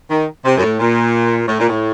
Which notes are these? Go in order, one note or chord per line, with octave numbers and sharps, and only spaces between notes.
D#3
C3
F#2
A2
A#2
A2
A#2
A2